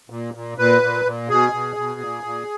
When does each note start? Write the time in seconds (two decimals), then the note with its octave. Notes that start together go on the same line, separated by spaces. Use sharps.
0.10 A#2
0.34 A#2
0.58 A#2 B4
0.82 A#2
1.05 A#2
1.29 B2 G#4
1.52 B2
1.76 B2
2.00 A#2
2.23 A#2